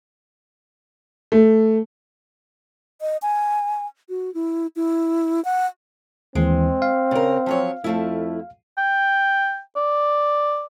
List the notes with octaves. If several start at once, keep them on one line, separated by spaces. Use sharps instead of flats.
A3
D#5
G#5
F#4
E4
E4
F#5
D#2 E3 G#3 C4
F5
C#3 A#4
F3 F#3 C#5
F2 F3 A3 E4
G5
D5